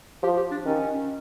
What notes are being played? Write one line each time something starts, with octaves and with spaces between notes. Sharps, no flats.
F3 G4
G4
D4
D#3 C#4